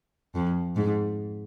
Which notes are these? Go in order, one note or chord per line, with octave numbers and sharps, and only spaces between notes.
F2
G#2